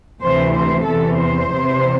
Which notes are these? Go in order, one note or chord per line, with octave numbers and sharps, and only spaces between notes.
D2 C3 E3 C5
C5
E2 C3 E3 A4
C5
E2 C3 E3